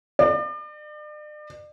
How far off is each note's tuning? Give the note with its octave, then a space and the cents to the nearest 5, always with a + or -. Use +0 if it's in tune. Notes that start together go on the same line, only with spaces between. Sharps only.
D5 +40